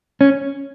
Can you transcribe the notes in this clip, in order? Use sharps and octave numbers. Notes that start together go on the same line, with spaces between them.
C#4